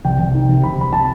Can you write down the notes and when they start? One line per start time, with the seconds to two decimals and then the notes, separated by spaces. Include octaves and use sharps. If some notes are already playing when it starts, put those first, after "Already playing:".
0.05 C2 G5
0.20 C2
0.34 D#3
0.49 C3
0.63 C3 B5
0.78 C2 B5
0.93 C3 A5